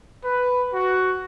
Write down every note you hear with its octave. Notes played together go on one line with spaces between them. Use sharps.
B4
F#4